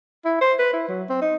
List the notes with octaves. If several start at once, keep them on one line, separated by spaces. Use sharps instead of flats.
E4
C5
B4
E4
F#3
C4
D#4